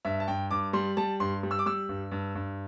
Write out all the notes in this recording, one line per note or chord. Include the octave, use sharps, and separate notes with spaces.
G2 E5
A5
G2 G5
G2 D6
G3 C6
G3 A5
G2 C6
G3
E6
D6
G3 E6
G2
G2
G2